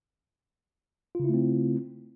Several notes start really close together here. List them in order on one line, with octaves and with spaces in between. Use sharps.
F4 C#3 E4 A3 C4